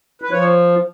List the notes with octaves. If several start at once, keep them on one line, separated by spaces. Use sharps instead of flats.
B4
F3 C#5